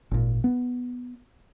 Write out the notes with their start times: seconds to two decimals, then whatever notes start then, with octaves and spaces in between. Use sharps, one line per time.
0.11 G#1 A#2
0.44 B3